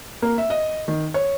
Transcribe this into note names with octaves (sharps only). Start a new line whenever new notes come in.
A#3
E5
D#5
D#3
C#5